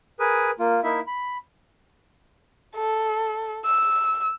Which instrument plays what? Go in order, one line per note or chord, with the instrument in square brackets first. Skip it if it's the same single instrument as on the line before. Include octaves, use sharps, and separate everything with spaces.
[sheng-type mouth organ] G#4 A#4 B4 D#6
A#3 F4
A#3 D#4 E4 E5
B5
[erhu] A4
E6